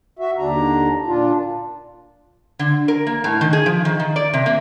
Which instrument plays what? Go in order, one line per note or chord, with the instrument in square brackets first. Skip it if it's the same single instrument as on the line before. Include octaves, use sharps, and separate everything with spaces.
[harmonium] F#4 E5
D#2 D3 D4 A#5
A#2 D4 F4
[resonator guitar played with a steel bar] D3
A#4
A#3
A2
D#3
G#4
F3
D#3
D#3
D5
C3
A#3